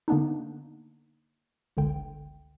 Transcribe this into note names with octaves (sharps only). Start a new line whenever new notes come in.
D3 A#3 B3 D4 D#4
G1 C#2 D3 G5